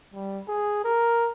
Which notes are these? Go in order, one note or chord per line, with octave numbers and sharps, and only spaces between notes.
G3
G#4
A#4